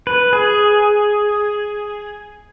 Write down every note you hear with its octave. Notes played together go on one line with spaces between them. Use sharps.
B4
G#4